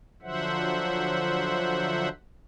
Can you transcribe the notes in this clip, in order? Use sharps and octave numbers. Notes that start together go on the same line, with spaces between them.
D3 F3 F#3 C5 E5 F#5